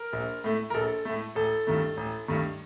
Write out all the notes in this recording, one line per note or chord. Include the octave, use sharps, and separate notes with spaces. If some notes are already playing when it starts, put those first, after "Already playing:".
Already playing: A#4
A#1
A2 A3
A#4
A#1 A4
A2 A3
A1 A4
G2 D#3 A3
A1
G2 D#3 A3